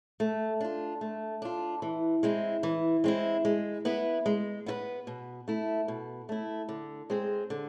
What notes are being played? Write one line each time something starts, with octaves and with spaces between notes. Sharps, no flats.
A3
D4 F4
A3
D4 F4
E3
G#3 C4 E4
E3
G#3 C4 E4
G#3
B3 E4 B4
G#3
B3 E4 B4
B2
A3 E4
B2
A3 E4
D3
G#3 C4 G#4 C5
D3